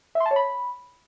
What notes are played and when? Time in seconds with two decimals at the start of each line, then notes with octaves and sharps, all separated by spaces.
0.15 E5
0.20 C6
0.26 A5
0.31 C#5
0.36 B5